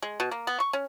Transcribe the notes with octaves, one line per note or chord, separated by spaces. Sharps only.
G#3
B2
A#3
B3
C#6
C#4